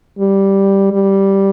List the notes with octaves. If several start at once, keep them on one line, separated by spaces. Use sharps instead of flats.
G3
G3